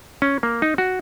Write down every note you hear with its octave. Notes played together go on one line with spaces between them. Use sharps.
C#4
A#3
D#4
F#4